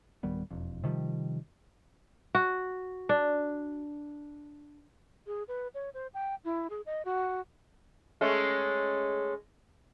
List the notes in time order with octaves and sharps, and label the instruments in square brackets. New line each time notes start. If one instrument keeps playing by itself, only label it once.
[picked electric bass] D1 D#3 G3 B3
E1 F2
C3 D#3 F3 G3
[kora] F#4
D4
[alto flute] G#4
B4
C#5
C5
G5
E4
G#4
D#5
F#4
[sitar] G#3 A3 C#4